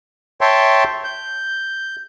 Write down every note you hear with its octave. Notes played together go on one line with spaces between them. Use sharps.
C#5 E5 G5 A5 C6
G6